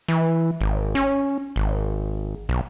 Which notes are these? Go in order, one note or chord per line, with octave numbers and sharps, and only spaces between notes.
E3
G#1
C#4
G#1
B1